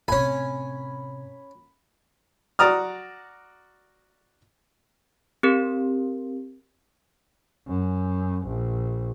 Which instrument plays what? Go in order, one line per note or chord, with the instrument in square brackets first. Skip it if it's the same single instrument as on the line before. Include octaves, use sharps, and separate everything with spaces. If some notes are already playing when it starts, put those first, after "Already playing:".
[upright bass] A2 C3 [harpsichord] C#4 G#5 [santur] B5
[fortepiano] F#4 D5 A#5 D#6 F6
[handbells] C4 G4 A#4
[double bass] F#2
A#1